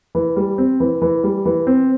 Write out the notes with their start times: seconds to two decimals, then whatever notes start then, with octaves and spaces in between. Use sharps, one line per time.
0.15 E3
0.36 G3
0.58 C4
0.80 E3
1.02 E3
1.24 G3
1.45 E3
1.67 C4